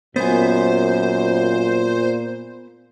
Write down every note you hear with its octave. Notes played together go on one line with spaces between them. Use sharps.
F#2 A#2 B3 C5 G#5